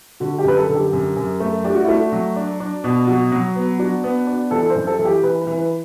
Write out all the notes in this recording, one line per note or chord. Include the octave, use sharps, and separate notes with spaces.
D3 F#4
G4
F#2 B4
A4
D3
G4
F#2
F#2
A3
D4 G4
F#4
A3 E4
F#4
F#3
D4
D4
B2
F#3 F#4
F#3
B3
D4 F#4
B3
D4
E3 A4
C5
F#2
A4
E3
G4
E3 B4
B4
E3
B4